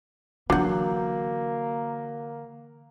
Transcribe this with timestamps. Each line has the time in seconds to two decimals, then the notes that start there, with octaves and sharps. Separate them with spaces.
0.50 D3 E3 F#3 A#3 D4 F#5 G6